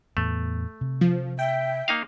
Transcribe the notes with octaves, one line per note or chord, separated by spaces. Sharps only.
E2 A2 A3 B3
C3
F3
E5 G5
A#3 D#4 F5